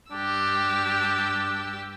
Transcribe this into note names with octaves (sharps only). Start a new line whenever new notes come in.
G2 D4 G4 E6